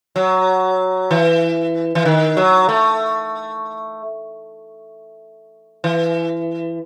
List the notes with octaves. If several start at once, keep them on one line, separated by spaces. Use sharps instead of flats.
F#3
E3
E3
D#3
F#3
A3
E3